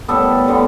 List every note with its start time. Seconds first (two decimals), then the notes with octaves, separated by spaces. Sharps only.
0.08 A2 G3 B3 A4
0.48 D3 G3 B3